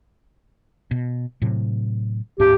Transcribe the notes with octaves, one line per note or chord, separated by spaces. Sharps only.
B2
A2 C3 F#3
D1 G#2 C#4 G4